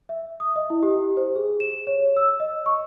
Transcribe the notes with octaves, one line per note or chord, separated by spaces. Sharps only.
E5
D#6
D#5
E4
G4
C5
G#4
E7
C#5
E6
D#5
C#6